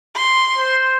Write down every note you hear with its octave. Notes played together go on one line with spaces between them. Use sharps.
C6
C5